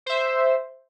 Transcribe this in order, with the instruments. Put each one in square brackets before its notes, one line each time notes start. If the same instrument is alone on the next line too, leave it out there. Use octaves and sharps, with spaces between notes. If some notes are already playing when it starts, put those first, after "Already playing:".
[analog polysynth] C5 E5